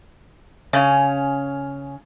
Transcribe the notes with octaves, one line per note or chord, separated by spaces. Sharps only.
C#3 C#4